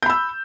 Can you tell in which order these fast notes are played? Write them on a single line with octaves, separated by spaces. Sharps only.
G6 B5 E6